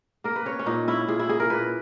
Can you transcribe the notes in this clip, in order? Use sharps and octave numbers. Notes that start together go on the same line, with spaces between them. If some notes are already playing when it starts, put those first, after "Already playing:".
A#3 A#4
B4
C#4 C#5
C#4
A#2 D#4
C#4 E4
A#2 G#4
E4
A#3 G#4
A#4
A#2 B4